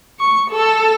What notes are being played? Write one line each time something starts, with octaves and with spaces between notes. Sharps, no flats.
C#6
A4